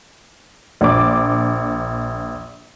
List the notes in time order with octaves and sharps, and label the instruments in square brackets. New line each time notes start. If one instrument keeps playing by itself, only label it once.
[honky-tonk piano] A#1 D4 D6